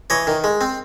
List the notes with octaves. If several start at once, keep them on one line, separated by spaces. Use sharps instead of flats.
E3 C#5 D#5
D#3
G#3
C4